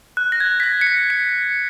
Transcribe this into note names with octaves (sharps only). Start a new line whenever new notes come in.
F#6
A#6
G#6
B6
A#6
C#7
B6
C#7